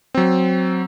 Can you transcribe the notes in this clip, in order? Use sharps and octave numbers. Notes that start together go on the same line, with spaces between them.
F#3 C4